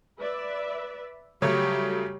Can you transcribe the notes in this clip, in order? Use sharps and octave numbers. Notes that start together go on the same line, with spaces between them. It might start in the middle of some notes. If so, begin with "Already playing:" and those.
B4 D5 E5
C#3 F#3 G3 A3 F#4 G4 C#5